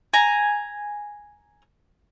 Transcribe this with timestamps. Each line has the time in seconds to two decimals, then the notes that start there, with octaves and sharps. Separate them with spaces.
0.14 G#5 A#5